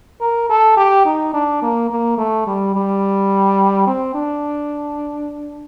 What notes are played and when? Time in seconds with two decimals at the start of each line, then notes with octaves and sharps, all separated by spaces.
0.21 A#4
0.50 A4
0.77 G4
1.06 D#4
1.34 D4
1.62 A#3
1.90 A#3
2.18 A3
2.47 G3
2.75 G3
3.87 C4
4.15 D4